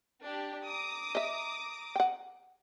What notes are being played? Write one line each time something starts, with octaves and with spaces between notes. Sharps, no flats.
D4 G4
A#5 D6 D#6
D#5 E5
F#5 G5